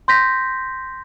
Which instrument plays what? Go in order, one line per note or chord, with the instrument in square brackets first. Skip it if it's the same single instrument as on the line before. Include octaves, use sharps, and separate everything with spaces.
[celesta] C6 G6 A#6 B6